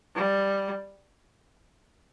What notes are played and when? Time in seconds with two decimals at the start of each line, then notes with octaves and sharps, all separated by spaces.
0.16 G3